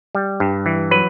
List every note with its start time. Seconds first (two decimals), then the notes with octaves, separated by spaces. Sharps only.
0.15 G3
0.40 G2
0.66 E3
0.91 F#3 B4